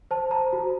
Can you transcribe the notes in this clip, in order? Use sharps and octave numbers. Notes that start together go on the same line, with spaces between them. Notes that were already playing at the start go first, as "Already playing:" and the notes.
C5 A5
C5 A#5
F#4